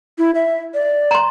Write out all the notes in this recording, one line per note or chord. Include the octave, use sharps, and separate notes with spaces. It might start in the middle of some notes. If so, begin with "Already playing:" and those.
E4
E5
D5
A#5 C6